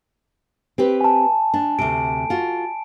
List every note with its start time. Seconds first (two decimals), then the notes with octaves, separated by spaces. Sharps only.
0.78 C4 G4 B4
1.01 G#5 A5
1.54 D4
1.79 D2 C3 D7
2.30 F4 F#4